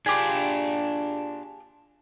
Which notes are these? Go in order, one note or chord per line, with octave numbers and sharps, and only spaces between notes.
D4 F4 G4 G#4